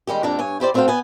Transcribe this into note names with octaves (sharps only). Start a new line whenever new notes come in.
D#3 G3 G#3 G4
F2 A#3 D4 G4 A4 A#5
G2 C#5 G#5
E4 G4 C5 D5
A3 C4 F#4 C5 F5 G5
B3 G#5